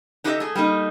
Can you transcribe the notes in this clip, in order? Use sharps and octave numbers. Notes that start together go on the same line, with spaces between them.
D4 D#4 G4 A4 D#5 E5
A3 G#4
G3 A3 A#3 D#4